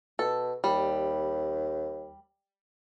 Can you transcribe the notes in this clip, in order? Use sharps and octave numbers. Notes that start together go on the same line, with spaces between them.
B2 A4
D#2 G3